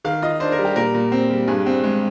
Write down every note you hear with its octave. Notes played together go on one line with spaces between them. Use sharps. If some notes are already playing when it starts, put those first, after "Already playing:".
D#3 F5
F4 D#5
D4 C5
A#4
G3
G4
A#2 A#4
A#2
C4
G3
G2 G#4
C4
G#3